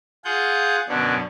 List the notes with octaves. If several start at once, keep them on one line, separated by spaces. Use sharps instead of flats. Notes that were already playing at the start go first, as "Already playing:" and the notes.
F4 G#4 F#5 G6
F#2 B2 D3 C#4 D4